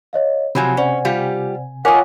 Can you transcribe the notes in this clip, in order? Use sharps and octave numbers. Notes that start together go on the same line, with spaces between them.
C#5 D#5 F5
C3 F3 F#3 C4 G#5 B5
C#4 C5 D5 F#5
G3 F4 G4
F4 A#4 C#5 D#5 F#5 G#5 D6 B6